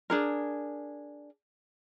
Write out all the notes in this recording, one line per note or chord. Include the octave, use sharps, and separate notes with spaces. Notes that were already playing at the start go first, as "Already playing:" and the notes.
D4 G#4 A#4